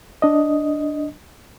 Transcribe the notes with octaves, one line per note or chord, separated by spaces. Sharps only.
D4 D#5